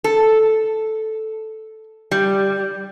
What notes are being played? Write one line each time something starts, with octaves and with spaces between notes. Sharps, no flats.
A4
G3